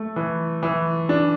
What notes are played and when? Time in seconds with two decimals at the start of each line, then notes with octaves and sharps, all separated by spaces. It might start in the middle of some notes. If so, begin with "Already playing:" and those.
Already playing: A3
0.16 E3
0.63 E3
1.09 D4